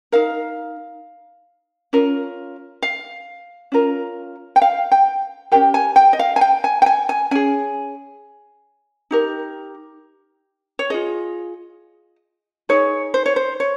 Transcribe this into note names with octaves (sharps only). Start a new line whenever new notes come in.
D#4 A#4 F5
C#4 F4 A#4
F5
C#4 F4 A#4
G5
F5
G5
C#4 G4 A#4 G5
G#5
G5
D#5
F5
G#5
G5
G#5
G5
G#5
G#5
C#4 G#4 G#5
D#4 G4 A#4
C#5
F4 G#4 D#5
D#4 G#4 C#5
C5
C#5
C5
C#5